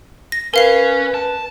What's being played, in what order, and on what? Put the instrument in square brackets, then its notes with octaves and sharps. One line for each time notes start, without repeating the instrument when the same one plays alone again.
[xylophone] A#6
[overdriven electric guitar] C#4 G#5 [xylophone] A#4 F5 C7 [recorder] B4
[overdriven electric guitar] A5